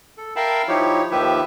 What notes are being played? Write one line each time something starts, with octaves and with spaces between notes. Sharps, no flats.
A4
A#4 E5 F5 G5 A5 B5
F3 D#4 E4 G4 C#5
D#2 D#3 F3 G4 B4 E5